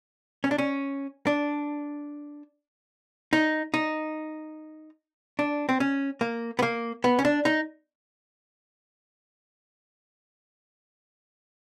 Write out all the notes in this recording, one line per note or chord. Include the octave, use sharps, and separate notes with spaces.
C#4
D4
C#4
D4
D#4
D#4
D4
C4
C#4
A#3
B3
A#3
B3
C#4
D4
D#4